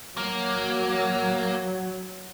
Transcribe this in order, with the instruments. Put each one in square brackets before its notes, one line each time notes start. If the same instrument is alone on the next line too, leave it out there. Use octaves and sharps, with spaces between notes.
[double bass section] F#3 [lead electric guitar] A#3